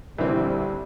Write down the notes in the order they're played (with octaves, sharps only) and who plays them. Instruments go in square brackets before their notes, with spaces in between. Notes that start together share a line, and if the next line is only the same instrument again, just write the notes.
[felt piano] A#1 D3 [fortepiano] E3 C4 [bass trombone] G3